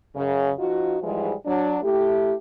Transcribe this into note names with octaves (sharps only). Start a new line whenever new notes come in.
F#2 C#3
F3 D#4 F4 F#4
G#2 E3 F3 G3 G#3
F#3 D4
A3 E4 G4